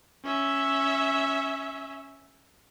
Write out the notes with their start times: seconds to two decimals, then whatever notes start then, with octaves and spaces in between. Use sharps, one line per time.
0.25 C#4 E5